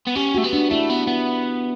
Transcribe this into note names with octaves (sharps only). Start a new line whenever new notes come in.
B3
C#4 G4
A3 F#4
B3
D4
A3 E4
B3
B3